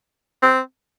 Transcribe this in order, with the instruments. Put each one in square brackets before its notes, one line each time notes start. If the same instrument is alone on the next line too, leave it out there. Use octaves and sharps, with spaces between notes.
[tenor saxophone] C4